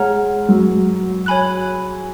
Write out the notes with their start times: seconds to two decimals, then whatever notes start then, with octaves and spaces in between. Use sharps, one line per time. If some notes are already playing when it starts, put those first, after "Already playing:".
Already playing: G#3 C#5 F#5 A#5 F6
0.49 F#3
1.26 C#5 G#5 B5 F#6